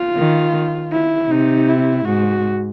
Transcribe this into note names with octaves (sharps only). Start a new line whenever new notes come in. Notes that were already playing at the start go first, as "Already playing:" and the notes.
Already playing: F4
D#3
E4
C3 D#4
E4
G#2 F#4